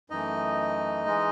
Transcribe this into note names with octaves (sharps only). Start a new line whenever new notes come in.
F#2 E3 A3 D#4 D#5
E3 G#3